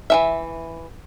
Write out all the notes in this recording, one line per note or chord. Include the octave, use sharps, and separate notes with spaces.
E3 F3 E5